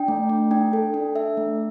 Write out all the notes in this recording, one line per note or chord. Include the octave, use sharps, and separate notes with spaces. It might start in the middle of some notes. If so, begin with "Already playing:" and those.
Already playing: D4 G5
A3
A3
D4 G5
A4
D4
A4 E5
A3